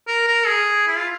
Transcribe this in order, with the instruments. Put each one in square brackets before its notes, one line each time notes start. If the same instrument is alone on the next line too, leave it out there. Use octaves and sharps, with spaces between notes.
[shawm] A#4
A#4
G#4
E4
F4